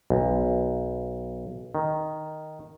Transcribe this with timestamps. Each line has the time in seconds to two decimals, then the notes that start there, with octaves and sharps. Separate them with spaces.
0.10 B1
1.75 D#3